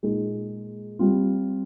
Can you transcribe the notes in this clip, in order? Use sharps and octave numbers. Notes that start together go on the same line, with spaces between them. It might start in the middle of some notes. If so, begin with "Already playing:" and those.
A#2 G#3 D#4 G#4
G3 C4 F4